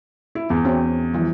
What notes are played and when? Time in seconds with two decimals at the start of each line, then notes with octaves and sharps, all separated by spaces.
0.35 E4
0.50 E2
0.65 C4 C#4 F#4
1.13 E3 F3 G3